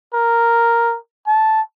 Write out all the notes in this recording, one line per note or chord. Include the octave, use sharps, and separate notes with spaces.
A#4
A5